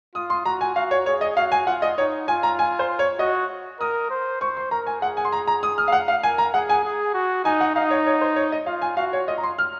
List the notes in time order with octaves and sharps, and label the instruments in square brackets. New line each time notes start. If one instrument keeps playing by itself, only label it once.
[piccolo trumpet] F4 [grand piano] D#6
[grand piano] C6
[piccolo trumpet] F#4 [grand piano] A#5
[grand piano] G#5
[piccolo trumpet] F#4 [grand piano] F5
[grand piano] C#5
[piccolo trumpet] G#4 [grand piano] C#5
[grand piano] D#5
[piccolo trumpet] F#4 [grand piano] F5
[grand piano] G#5
[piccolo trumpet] F4 [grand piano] F#5
[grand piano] D#5
[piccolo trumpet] D#4 [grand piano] C#5
[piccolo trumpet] F4 [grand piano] G#5
[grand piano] A#5
G#5
C5
C#5
[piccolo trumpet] F#4 [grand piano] D#5
[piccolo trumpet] A#4 [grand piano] D#6
[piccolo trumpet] C5
[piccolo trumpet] C5 [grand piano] C#6
[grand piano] C6
[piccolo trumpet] A#4 [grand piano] A#5
[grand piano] G#5
[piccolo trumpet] G#4 [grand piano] F#5
[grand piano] G#5
C6
A#5
A#5
D#6
F6
F5
F#5
F5
[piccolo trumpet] A#4 [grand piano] G#5
[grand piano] A#5
[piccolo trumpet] G#4 [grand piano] F#5
[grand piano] G#5
[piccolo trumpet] G#4
F#4
[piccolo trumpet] D#4 [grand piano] G#5
[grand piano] F#5
[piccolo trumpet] D#4 [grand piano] F5
[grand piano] C#5
C#5
C5
C#5
D#5
[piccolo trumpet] F4 [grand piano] F5
[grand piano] G#5
[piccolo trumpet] F#4 [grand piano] F5
[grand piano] C#5
[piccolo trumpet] F4 [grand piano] D#5
[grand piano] A#5
C6
F6